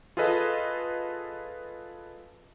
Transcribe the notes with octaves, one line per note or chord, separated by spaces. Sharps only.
F4 G#4 A4 B4 D#5